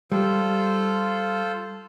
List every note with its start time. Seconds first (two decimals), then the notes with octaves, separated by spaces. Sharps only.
0.12 G3 F4 A4 C5